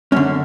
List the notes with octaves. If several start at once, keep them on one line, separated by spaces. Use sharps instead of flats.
F#2 D3 C#4